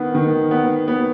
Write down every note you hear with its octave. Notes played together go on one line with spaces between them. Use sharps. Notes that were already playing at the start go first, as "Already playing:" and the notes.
Already playing: D#3 B3
D#3
B3
B3